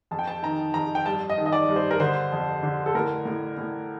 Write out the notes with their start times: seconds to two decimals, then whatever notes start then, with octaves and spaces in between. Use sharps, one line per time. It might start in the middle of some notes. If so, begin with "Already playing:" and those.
0.11 F2 A5
0.19 G5
0.27 A5
0.42 D#3 A#5
0.74 F2 A#5
0.95 G5
1.06 G2 A5
1.30 D#5
1.38 D#3
1.46 D#5
1.52 D5
1.69 G2
1.76 C5
1.91 A#4
2.00 D3 C5
2.32 F2
2.63 D3
2.86 A4
2.95 A2 A#4
3.25 A2
3.58 A2